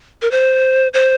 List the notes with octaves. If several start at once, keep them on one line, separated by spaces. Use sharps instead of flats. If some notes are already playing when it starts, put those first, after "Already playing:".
A#4
C5
C5